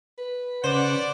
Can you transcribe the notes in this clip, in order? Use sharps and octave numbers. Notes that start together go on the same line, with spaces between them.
B4
C#3 C5 D5 F#5